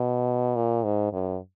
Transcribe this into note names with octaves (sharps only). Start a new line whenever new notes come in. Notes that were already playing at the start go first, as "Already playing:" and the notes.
Already playing: B2
A#2
G#2
F#2